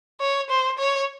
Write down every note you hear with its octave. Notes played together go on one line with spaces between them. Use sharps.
C#5
C5
C#5